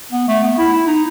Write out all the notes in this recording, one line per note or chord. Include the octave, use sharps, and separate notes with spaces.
B3
A3
B3
E4
E4
D#4